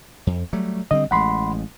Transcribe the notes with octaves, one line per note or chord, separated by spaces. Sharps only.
F2
F#3 G3 A3
D3 G3 C4 D#5
A1 G#3 F#5 B5 C6